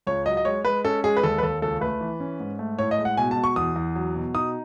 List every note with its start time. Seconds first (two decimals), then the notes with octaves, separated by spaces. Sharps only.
0.07 C#2 C#5
0.26 F#3 D#5
0.37 D#5
0.45 G#3 C#5
0.64 G#3 B4
0.85 C#4 A4
1.04 G#3 G#4
1.17 B4
1.23 D#2 A4
1.38 B4
1.43 D#2 A4
1.62 C#2 A4
1.81 A3 B4
2.01 E3
2.20 C#4
2.40 G#2
2.59 A3
2.79 A2 C#5
2.91 D#5
2.99 G#3
3.05 F#5
3.17 B2 G#5
3.31 A5
3.37 B2
3.44 C#6
3.56 E2 D#6
3.76 E2
3.96 F#3
4.16 B2
4.35 D#4 D#6